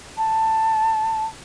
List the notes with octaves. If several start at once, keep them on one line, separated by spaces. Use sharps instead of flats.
A5